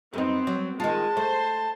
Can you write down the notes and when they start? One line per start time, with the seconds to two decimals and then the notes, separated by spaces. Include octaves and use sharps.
0.13 F#2 B3 C4 D#4
0.47 F#3
0.80 D#3 G#3 F4 A5
1.17 A3 C5